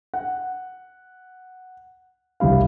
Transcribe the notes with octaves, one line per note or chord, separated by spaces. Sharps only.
F#5
F#1 C2 G3 E4 F5